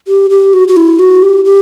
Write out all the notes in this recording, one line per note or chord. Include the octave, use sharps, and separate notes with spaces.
G4
G4
F#4
F#4
E4
F#4
G4
G4